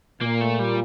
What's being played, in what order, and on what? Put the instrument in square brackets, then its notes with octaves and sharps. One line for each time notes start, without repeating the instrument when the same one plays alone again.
[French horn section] A#2 [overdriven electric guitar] A#3
[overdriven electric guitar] A3
G3